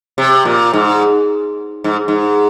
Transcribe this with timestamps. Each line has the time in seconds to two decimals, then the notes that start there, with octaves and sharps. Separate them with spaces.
0.18 C3
0.45 A#2
0.73 G#2
1.84 G#2
2.08 G#2